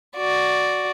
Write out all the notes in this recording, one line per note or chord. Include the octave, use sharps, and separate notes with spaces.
F#4 D5